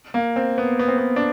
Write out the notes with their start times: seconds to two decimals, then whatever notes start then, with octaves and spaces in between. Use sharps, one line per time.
0.14 A#3
0.36 C4
0.58 B3
0.79 B3
0.88 C4
0.98 B3
1.16 D4